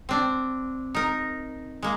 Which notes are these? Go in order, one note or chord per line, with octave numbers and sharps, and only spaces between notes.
C4 D4
D#4 A#4
G#3 A#3